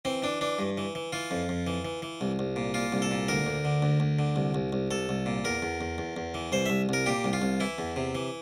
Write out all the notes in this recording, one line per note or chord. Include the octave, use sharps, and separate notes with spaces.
E3 C4
E3 D4
E3 D4
G2
E3
E3
E3 F4
F2
F2
E3
E3
E3
C2
C2
A#2
A#2 F4
C2
A4
A#2
D2 A#4
D2
D3
D2
D2
D3
C2
C2
C2
C2 A4
C2
A#2
E2 A#4
E2
E2
E2
E2
E3
C2 C5
C2 E5
C2 A#4
A#2 G4
C2
F4
C2
E3 E4
E2
C3
E3